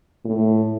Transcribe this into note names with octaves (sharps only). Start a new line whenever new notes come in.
A2